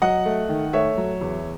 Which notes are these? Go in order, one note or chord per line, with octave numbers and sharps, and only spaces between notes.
F#3 D#5 F#5
A3
D#3
A3 C#5 E5
F#3
E2